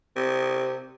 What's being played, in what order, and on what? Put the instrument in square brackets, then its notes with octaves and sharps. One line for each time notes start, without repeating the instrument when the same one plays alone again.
[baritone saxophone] C3